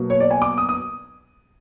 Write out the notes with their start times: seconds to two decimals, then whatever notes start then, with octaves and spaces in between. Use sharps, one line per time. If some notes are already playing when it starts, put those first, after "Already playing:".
Already playing: B2 F#3 A#3
0.10 C#5
0.20 D5
0.31 G#5
0.42 D6
0.58 D#6
0.69 D#6